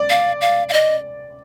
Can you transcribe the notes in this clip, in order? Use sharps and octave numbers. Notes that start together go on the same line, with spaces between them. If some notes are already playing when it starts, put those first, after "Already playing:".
Already playing: D5
F5
F5
F5
D#5